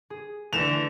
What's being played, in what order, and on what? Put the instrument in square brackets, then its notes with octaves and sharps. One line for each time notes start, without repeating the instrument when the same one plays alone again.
[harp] G#4
[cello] D3 E3 [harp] A3 [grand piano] E7 F7